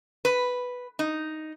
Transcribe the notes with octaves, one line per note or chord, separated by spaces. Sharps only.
B4
D#4